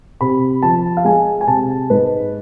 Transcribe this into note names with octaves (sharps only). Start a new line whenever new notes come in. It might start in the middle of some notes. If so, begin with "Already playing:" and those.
C3 B5
F3 A5
F5
G#3 G#5
G#5
C3 A5
G#2 B4